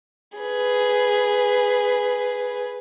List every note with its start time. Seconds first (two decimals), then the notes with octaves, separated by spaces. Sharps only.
0.38 G#4 B4